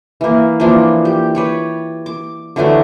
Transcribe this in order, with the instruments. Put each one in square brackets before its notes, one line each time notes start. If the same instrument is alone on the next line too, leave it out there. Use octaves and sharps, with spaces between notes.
[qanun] E3 A#3
E3 F3 A#3 D4
G4
B4 C#5 D5
D6
D3 E3 F#3 A3